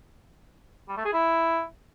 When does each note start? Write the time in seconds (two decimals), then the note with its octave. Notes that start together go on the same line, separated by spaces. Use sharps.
0.89 G3
0.97 A3
1.05 G#4
1.13 E4